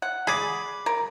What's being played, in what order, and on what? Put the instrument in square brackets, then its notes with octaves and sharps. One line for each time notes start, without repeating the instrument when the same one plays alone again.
[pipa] F#5
[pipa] G#4 [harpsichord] D5 B5
[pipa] A#4